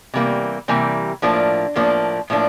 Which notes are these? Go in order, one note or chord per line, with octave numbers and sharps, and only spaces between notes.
C3 E3 G3 A#3
C3 E3 G3 A#3
A2 F3 A#3 D4
A2 F3 A#3 D4
A2 F3 A#3 D4